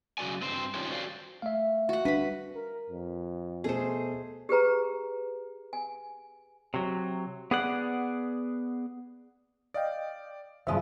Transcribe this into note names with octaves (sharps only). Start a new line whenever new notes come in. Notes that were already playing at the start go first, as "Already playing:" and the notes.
C#3 F#3 F#4 D5 G#5
G2 C4 C5
D#3 C#4 D4 F4 G4 C#5
F#4 C5 D5 F5
A3 E5 F5
F#4 F#5
G3 D4 B4 B5
A#4
F2
B2 A3 G#4 C5
G4 G#4 B4 A#5
G#5
C3 F#3
B3 G#4 D5 F#5
D5 D#5 F5 G5
G2 C#3 F3 F#3 G#3 E5 C6 D#6